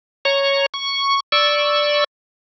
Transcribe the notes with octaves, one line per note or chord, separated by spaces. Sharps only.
C#5 A#5 C#6
C#6
D5 C#6 E6